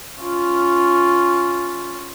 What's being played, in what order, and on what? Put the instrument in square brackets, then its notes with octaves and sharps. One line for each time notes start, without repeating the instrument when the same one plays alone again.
[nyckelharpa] C#4 F4